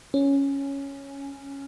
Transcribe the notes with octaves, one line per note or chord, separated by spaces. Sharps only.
C#4